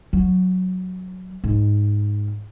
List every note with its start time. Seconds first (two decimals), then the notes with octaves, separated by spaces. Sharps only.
0.13 F#3
1.44 G#2